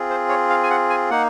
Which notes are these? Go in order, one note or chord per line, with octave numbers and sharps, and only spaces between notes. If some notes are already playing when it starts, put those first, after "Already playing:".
Already playing: C4 F4 G#4
C5
C#5
F5
G#5
F#5
G#5
A#3 D#4 F#5